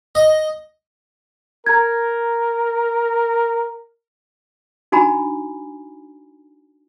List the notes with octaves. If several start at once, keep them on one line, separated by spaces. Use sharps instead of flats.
D#5
A#4 A#5 G#6
D4 D#4 F#4 G#5 A#5 B5